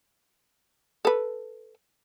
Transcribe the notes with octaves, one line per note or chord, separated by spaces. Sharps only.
A4 B4